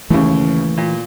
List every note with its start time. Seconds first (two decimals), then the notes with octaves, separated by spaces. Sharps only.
0.10 D#2 C#3 E3 A3 A#3
0.77 A#2